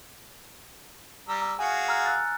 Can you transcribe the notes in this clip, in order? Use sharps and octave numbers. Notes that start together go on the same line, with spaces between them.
G3 A#5 E6
F#4 G#4 F5 G#5 C#7
A#5 E6 F6
E6 F#6 A6